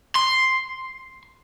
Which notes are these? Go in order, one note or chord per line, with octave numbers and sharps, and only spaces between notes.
C6